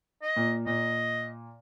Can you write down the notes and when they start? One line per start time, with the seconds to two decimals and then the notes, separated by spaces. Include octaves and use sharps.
0.22 D#5
0.36 A#2
0.66 A#2 D#5